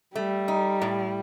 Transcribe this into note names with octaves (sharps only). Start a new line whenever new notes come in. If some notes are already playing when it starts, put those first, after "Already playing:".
G3 A3
D#4
A2